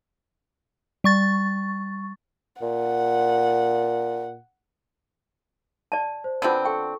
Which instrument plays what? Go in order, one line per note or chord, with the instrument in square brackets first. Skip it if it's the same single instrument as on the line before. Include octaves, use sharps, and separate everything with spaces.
[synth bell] G3 C#6 A6
[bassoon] A#2 [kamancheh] F#5
[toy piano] D5 A5
[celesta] C5
[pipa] D3 B3 C4 [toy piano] F4 A5
[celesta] A4 C#6 [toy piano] G5